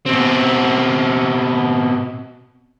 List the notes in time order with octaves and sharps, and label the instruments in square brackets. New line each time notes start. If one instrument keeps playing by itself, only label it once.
[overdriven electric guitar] B2 C4